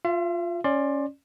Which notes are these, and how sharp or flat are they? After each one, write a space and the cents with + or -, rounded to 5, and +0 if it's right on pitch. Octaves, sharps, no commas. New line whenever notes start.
F4 +5 E5 +45
C#4 +0 D5 +15 C6 +20